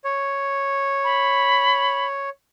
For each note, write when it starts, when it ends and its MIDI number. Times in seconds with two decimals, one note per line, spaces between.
0.04 2.30 73
1.04 2.07 83